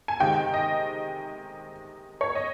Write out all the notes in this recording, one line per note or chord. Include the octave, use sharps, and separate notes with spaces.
G#5
C3 D#3 G#3 G5
D#5
C#5
D#5